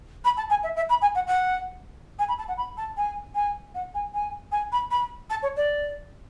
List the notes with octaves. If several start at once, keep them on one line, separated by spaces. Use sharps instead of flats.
B5
A5
G#5
E5
E5
B5
G#5
F#5
F#5
G#5
B5
A5
F#5
B5
A5
G#5
G#5
F#5
G#5
G#5
G#5
B5
B5
A5
C#5
D5